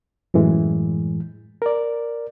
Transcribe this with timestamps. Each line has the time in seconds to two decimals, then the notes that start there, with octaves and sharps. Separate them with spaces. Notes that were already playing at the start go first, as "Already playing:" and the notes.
0.34 F#2 A2 E3 G#3
1.62 A#4 D5